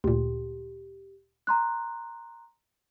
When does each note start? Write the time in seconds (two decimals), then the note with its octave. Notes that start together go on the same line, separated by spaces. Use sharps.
0.04 D2 A#2 G4
1.47 A#5 C6 F#6